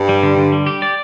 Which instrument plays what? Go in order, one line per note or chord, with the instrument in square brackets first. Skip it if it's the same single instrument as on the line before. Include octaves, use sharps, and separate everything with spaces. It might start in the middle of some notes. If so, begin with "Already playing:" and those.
Already playing: [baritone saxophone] G2
[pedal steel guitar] G3
D3
D3
G3
G4
D5